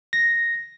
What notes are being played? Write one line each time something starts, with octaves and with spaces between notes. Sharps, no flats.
A#6